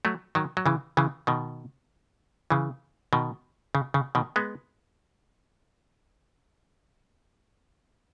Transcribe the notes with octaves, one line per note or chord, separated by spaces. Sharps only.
F#3 A3
D#3 F#3
F#3
C#3 E3
C#3 E3
B2 D#3
C#3 E3
B2 D#3
C#3
C#3
B2 D#3
G#3 B3